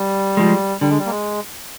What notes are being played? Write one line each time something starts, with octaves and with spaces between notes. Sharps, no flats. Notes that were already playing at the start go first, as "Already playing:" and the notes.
Already playing: G3
F3 G#3
D3 G3
G#3
G3
A#3
G#3